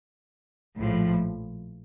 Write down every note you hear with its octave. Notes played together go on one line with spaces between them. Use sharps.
A#1 A2 F3